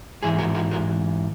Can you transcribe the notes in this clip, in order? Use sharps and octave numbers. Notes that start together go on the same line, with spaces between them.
G#2 E3 E4 G#4
F#4 A#4
F#4 A#4
F#4 A#4